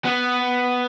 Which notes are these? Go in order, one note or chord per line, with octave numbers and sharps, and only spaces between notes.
B3